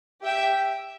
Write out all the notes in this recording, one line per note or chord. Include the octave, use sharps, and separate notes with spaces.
G4 E5 G5